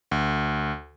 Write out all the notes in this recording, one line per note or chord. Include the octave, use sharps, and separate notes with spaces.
D2